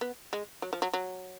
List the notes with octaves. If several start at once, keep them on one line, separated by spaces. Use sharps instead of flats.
B3
G#3
F#3
F3
F#3
F#3